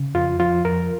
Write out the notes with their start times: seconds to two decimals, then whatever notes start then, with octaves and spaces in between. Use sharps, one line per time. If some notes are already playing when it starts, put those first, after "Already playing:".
Already playing: C#3
0.15 F2 F4
0.40 F3 F4
0.65 F2 A#4